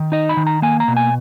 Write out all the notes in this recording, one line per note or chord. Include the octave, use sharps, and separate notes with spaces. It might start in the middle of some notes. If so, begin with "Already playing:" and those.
Already playing: D#3
D#4 D#5
B5
D#3
A#5
A#3 G#5
A#5
B2
G#5